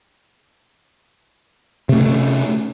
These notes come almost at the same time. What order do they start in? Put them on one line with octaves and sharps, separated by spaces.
C3 A3 C#4